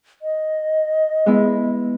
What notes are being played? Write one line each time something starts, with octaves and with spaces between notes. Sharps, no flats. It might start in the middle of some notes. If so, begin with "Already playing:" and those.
D#5
G#3 B3 E4